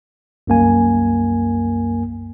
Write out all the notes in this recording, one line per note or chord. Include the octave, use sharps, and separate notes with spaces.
C2 F#2 A#3 G#5